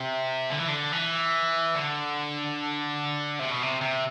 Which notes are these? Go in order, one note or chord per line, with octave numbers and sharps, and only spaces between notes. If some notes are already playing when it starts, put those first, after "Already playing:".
Already playing: C3
D3
E3
D3
E3
D3
C3
B2
C3
C3